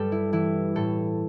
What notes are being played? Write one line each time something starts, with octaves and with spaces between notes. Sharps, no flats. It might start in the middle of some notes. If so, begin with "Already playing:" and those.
Already playing: G2 G3 A4 G5
E4
E3 E4
A2 A4